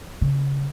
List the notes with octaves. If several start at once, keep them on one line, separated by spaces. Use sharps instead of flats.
C#3